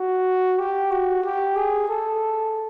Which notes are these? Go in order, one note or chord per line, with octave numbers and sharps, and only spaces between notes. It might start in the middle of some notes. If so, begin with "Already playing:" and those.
Already playing: F#4
G4
F#4
G4
G#4
A4